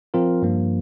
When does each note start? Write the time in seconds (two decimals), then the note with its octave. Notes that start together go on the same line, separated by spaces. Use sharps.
0.14 F3 C4 F4 A#4
0.42 G2 F3 A#3